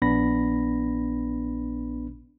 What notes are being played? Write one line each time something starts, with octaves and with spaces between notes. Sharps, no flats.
A#1 B3 D4 B5 A#6